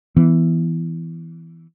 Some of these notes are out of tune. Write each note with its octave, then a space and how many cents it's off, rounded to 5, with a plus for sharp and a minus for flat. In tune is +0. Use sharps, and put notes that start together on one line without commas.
E3 +0 B3 +0